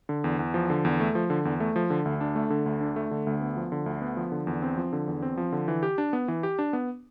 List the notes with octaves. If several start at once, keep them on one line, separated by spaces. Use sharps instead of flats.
D3
E2
E2
F3
D3
E2
A3
F3
D3
E2
A3
F3
D3
D2
D4
A3
D3
D2
D4
A3
D3
D2
B3
F3
D3
D2
B3
F3
D3
E2
C4
F3
D3
E2
C4
F3
D3
E3
G4
D4
B3
E3
G4
D4
B3